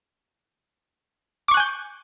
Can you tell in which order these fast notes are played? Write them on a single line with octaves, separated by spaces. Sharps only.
D6 C#6 F#6 G#5 G6